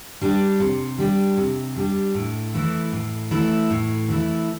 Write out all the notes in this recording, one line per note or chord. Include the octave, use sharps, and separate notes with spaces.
G3 D4 G4
C3
G3 D4 G4
C3
G3 D4 G4
A2
E3 A3 E4
A2
E3 A3 E4
A2
E3 A3 E4